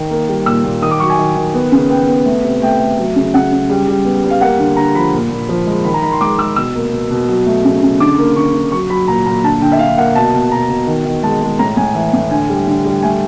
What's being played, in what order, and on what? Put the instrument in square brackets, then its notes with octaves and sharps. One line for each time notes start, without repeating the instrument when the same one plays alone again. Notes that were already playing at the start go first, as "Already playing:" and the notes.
Already playing: [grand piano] D#3
A#3
G3
A#2 E6
A#2
D#3 D#6
D6
F#3 C#6
G#5
D#3
D#3
B3
C#3
B3 G5
B3
A3
C3
A3 G5
A3
F#3
C#3
C#3 F#5
C#3
G3
G3
B3
G3
F5
A#3 F#5
D3
D3 A#5
F3 B5
A#2
A#2
F3
G#3
D#3 B5
A#5
D#3 B5
C6
G#3 D6
G#3 E6
B2 E6
A#3
B2
B2
F#3
A3
C#3
C#3
D3 D6
A#3
D3 C#6
D3
F#3 C#6
F#3 B5
A#2 A#5
A#2 A#5
D3 A5
D3 G5
E5
D3 F5
A#3 F#5
B2 A5
B2
B2 A#5
B2
D#3
D#3
G#3 A5
G#3
A2 A#5
A2 G#5
E3
A2
D3 G#5
G3
D3
G3
A3 G#5